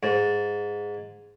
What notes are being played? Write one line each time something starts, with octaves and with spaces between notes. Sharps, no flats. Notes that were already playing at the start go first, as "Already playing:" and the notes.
G#2